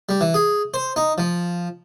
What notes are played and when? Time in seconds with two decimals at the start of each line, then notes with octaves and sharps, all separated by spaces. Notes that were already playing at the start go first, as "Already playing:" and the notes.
0.09 G3
0.21 E3
0.34 G#4
0.74 C5
0.96 D#4
1.18 F3